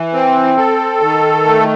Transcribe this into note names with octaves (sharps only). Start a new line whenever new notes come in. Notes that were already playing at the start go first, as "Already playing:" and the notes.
Already playing: E3
C4
A4
D#3
A3